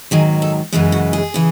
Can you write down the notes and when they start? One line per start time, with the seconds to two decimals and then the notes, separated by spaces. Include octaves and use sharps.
0.11 G#2 D#3 F#3 G#4
0.42 A4
0.72 F#2 C#3 E3 G#3 G#4
0.92 F#4
1.13 G#4
1.34 C#3 E3